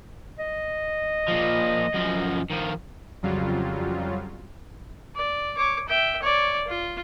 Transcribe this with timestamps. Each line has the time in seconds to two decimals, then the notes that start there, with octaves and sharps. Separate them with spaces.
0.39 D#5
1.28 A#2 F3
1.94 F#2 F3
2.51 D#3 F3
3.23 F2 C#3 F#3 G3 F4
5.16 D5
5.57 C#5 D6
5.89 E5 G5
6.22 C#5 D5
6.68 F4